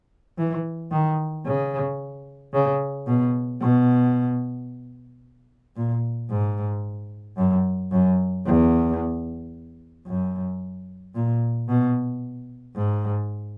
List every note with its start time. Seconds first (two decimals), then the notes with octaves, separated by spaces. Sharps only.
0.38 E3
0.91 D#3
1.46 C#3
2.53 C#3
3.07 B2
3.61 B2
5.76 A#2
6.30 G#2
7.37 F#2
7.92 F#2
8.46 E2
10.07 F#2
11.15 A#2
11.69 B2
12.76 G#2